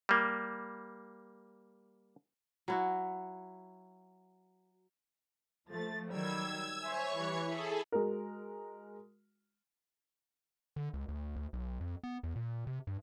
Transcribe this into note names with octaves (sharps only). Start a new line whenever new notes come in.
G3 A#3
F#3 E4 F#4
F3 A3 A6
D#3 F#3 G3 E6 G#6
C5 C#5 E5 G#5 C#6
E3 G3
E4 G#4 A4 B6
G#3 F#4 A#4
D3
C#2
D2
D2
B1
F2
B3
E2
A#2
C3
G2